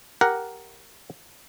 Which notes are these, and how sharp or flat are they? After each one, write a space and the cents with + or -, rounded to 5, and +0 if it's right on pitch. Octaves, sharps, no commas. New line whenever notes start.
G4 +0 A#4 +0 F#5 +0